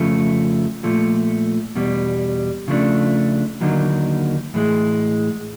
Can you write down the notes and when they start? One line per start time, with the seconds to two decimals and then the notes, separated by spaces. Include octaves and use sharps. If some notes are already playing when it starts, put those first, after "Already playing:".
Already playing: F2 C#3 F3 A3
0.83 A#2 F3 A3
1.75 E2 B2 G3
2.68 C#3 F3 A3 D4
3.60 D#2 D3 F#3 A#3 D#4
4.54 A2 E3 G#3